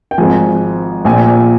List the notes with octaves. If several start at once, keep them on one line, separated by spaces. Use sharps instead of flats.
G5
G#1 G#2 F3 G#5
A#1 A#2 F3 G#5